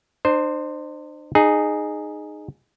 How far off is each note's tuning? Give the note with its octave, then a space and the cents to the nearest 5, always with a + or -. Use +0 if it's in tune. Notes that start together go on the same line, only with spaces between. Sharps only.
D4 +45 C5 +0
D#4 -20 G#4 +0